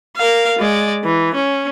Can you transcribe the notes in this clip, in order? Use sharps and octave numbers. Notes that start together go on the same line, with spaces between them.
A#4 F5
G#3 D5
E3
C#4